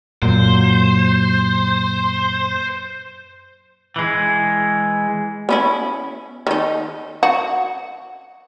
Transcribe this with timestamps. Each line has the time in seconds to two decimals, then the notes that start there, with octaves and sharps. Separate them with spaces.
0.22 F#2 A#2 F#3 C5
3.96 E3 G#3
5.49 B3 C#4 E4
6.47 D#3 D#4
7.23 F#4